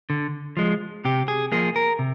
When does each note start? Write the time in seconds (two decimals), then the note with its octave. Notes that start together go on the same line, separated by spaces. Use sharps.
0.10 D3
0.57 F3 G#3
1.05 C3 G4
1.28 G#4
1.52 F3 A#3 G#4
1.76 A#4
1.99 C3